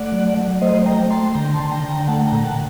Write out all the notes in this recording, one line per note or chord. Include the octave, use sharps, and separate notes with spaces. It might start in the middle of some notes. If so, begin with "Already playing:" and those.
Already playing: A3 D5 F#5
F#3
F#3
A3 C5 D#5
A3 G5 A#5
A3 A5 C6
D3 G5 A#5
A5 C6
D3
G5 A#5
D3
G5 A#5
A3 F#5 A5
G5 A#5
A#2
F#5 A5